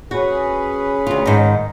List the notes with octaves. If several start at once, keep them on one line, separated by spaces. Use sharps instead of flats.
C#4 F#4 G#4 B4
D2 F4
G#2 D#3